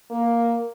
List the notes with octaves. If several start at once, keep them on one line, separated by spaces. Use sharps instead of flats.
A#3